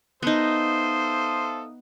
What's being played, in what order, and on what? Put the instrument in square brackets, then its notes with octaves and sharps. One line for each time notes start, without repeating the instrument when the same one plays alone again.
[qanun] B3 D#4 [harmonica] A4 C5 [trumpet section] E5 F5 D#6